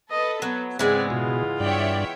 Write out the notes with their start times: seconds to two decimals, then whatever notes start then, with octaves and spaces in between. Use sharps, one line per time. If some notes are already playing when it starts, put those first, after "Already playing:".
0.11 A4 B4 D#5
0.42 F#3 B3
0.79 G#2 C#3 E3 G#3 B3 C4 G#4 D5
1.10 B2 F4
1.60 G2 C#5 D5 E5 G5